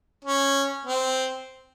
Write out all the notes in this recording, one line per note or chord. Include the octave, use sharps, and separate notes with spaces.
C#4
C4